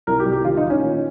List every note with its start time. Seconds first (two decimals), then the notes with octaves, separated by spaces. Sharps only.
0.07 C2 A#4
0.20 G4
0.26 C2
0.32 G4
0.45 D#3 F4
0.57 D#4
0.63 D#3
0.70 C#4
0.82 A#2